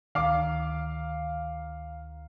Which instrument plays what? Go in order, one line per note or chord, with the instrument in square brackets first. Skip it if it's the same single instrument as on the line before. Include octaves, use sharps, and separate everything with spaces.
[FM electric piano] D2 D#3 [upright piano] F5 D6